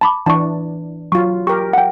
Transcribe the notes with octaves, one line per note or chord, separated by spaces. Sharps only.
A5 B5 D6
E3 D4 A5 C#6
F#3 F4 C#6
G4 A#4 C#6
F#5 G5